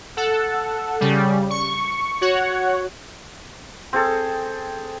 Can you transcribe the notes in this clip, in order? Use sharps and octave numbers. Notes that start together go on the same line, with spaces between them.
A4 F#5
C#3 G3
C#6
F#4 C#5 F#5
C4 G#4 A4